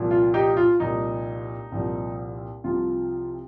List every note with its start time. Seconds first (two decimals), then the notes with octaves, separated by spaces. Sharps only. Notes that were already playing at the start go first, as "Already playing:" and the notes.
Already playing: C2 A#2 F3
0.11 F4
0.34 D#4 G4
0.57 F4
0.80 C2 A#2 F3 D#4
1.72 C2 A#2 F3
2.64 C2 C3 F3 F4